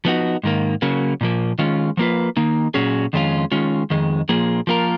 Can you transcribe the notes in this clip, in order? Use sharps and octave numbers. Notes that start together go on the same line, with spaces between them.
F3 B3 D#4 F#4
G#2 D#3 A#3
C#3 F#3 A#3
A#2 F3 A#3
D#3 G#3 C#4 F4
F3 A#3 F4 B4
D#3 A#3 D#4
A#2 F#3 C#4 G#4
F2 D#3 G#3 C#4 F4
D#3 G#3 C#4 F4
F2 D#3 G#3
A#2 F3 A#3 F4 G#4
F3 A#3 F4 A#4